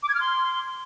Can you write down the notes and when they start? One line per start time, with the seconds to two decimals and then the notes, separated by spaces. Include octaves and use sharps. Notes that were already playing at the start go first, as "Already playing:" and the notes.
0.03 D6
0.09 G#6
0.15 F6
0.21 C6